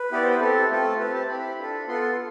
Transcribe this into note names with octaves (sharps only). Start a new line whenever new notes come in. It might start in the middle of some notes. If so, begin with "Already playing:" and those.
Already playing: B4
B3 E4 G4 D5
C5
B4
C4 G4 A4
A3 C4 F4 A4
C4 G4 B4
A5
C4 E4 G4 B5
D4 F4 A4
B3 F4 A4 C6
C6